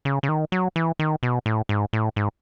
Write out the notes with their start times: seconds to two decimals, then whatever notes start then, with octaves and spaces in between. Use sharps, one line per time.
0.05 C#3
0.23 C#3
0.29 D#3
0.52 F#3
0.76 E3
0.99 D#3
1.23 B2
1.46 A2
1.69 G#2
1.93 A2
2.16 G#2